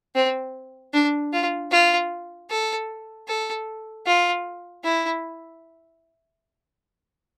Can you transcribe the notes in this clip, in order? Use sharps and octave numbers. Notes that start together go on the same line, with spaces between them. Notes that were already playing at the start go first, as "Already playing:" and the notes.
C4
D4
F4
F4
A4
A4
F4
E4